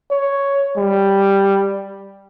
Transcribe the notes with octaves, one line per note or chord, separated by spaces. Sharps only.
C#5
G3